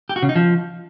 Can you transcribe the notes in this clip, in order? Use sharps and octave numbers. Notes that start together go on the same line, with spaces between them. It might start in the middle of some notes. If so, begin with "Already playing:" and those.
G4
F#4
C#3
D#4
F3